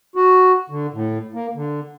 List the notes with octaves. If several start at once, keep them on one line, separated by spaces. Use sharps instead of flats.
F#4
D3
A2
A#3
D3